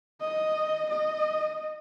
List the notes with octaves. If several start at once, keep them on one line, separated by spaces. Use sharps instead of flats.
D#5
D#5